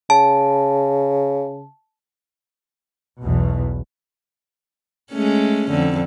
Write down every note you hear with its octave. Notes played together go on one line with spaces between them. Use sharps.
C#3 A5
B1 E2 B2
G#3 A3 C#4
F2 D3